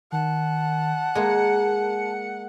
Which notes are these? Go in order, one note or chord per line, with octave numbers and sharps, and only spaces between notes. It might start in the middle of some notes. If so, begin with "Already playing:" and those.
D#3 F#5 A5
G#3 A#3 C#7